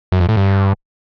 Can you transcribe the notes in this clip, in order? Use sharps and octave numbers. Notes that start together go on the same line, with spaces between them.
F#2
F2
A2
G2